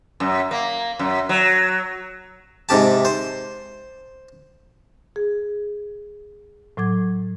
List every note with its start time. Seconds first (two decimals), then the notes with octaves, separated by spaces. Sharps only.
0.20 F#2
0.51 A#3
0.99 F#2
1.29 F#3
2.69 G#2 C3 G4 A5
3.05 C5
5.16 G#4
6.77 A2 F#3 D6 G#6